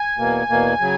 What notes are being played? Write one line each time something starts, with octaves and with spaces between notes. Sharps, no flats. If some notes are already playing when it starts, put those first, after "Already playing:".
Already playing: G#5
E2 B2 A#3
E2 B2 A#3
C#3 F#3